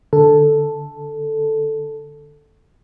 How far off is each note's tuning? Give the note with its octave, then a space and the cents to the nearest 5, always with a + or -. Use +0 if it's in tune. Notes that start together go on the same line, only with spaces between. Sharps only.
D3 +0 A4 +0